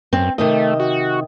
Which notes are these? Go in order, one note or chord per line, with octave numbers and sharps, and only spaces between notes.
F#2 C4
C3 D#3 A3 D#5
F#4